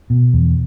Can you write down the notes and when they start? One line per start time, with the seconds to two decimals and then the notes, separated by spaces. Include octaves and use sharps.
0.10 B2
0.33 E2